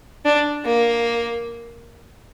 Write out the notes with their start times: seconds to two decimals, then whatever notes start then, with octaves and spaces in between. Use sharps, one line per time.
0.25 D4
0.65 A#3